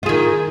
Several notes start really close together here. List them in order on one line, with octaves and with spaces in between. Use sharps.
F4 G#4 D#3